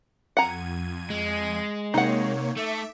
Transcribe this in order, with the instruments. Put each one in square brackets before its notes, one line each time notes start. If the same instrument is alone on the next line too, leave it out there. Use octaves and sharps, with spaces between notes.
[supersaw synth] F2 G#6 D#7 [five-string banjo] F#5 A#5
[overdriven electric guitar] G#3
[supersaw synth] C3 A#3 C#5 [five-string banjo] D#4 F#5
[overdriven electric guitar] A3 [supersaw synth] E5 D6 B6